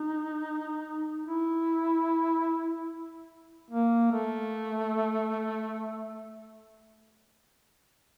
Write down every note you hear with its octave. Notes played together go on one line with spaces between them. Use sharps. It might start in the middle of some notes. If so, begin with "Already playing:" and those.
Already playing: D#4
E4
A#3
A3